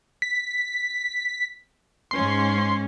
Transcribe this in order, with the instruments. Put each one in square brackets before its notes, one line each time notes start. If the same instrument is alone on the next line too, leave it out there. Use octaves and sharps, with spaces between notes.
[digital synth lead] B6
[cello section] G#2 C#4 [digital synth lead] C6